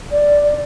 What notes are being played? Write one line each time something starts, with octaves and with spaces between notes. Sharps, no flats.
D5